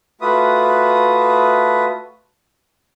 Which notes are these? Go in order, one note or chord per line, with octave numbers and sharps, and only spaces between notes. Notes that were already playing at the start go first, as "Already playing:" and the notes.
A3 F4 F#4 B4 E5 D#6